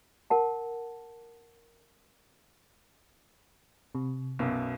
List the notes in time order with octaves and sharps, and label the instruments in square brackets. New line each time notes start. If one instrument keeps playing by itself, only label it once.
[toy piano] A#4 F#5 A5
[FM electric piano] C3
[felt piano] B1 F#2 B2